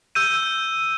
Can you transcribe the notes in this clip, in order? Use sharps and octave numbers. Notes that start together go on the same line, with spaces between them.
E6 G6 D#7